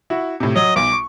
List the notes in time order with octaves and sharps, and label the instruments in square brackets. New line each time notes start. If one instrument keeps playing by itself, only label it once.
[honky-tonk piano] E4 F#4
A2 C3
[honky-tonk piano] F#3 [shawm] D#5
[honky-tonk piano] B1 [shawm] D6
[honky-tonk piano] C#6